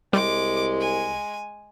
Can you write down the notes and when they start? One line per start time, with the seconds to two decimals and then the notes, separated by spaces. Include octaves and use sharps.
0.13 C2 G3 G#3 D6
0.80 G#5